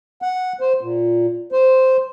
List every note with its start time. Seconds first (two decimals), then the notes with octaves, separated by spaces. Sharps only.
0.22 F#5
0.61 C5
0.81 A#2
1.52 C5